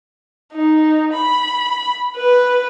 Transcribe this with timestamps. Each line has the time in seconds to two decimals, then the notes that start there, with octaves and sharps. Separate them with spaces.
0.53 D#4
1.14 B5
2.16 B4